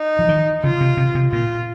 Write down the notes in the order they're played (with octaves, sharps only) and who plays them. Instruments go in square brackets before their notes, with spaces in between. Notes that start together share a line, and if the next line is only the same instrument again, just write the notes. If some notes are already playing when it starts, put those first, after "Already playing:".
Already playing: [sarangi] D#4
[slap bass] F3
D#3
[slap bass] C#3 [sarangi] F4
[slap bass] C3
C3
C3
[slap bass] A#2 [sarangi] F4